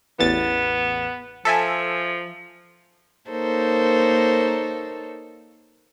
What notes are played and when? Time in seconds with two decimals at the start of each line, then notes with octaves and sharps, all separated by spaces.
0.19 A1 E2 B3 A6
1.45 F3 A4 E5 G#5
3.29 A#3 D#4 A4 A#4 C5 C#5